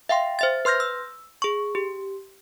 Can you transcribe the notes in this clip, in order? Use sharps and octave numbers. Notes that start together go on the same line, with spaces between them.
E5 F5 G5 C6
C5 E5 A6
B4 C6 F6 G6 A#6
E6
G#4 C#6
G4